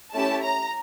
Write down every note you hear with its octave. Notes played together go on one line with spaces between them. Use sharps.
A3 C#4 E4 G4 A5
A#5